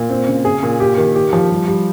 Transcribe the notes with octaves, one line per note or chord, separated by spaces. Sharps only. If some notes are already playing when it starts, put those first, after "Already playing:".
Already playing: A#2
C4
C#3
G#4
A#2
G4
D#3
G4
F3
G3
G3